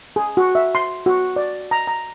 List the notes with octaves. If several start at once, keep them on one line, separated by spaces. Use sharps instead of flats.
G#4
F#4
E5
C6
F#4
D5
A#5
A#5